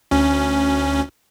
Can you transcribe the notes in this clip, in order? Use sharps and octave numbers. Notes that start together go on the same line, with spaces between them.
D2 C#4